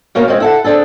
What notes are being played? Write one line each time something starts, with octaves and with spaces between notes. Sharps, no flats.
B2 A#3 C#4 A#4
F3 G#3 C4
E4 A4 F#5
C4 D4 G#4 A4